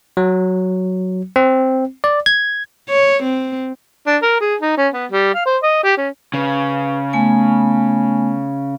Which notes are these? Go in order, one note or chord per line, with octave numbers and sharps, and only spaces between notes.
F#3
C4
D5
G#6
C#5
C4
D4
A#4
G#4
D#4
C#4
B3
G3
F5
C5
D#5
G4
C#4
C#3 B4
A3 B3 G#5